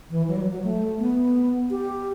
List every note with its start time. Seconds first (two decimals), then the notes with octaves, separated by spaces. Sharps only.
0.10 E3
0.28 F#3
0.36 G3
0.40 F#3
0.51 F#3
0.64 A3
0.99 B3
1.71 G4